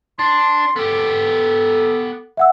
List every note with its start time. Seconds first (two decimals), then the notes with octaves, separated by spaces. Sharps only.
0.19 D4 C6
0.76 B3 G4 A4
2.37 E5 F#5 E6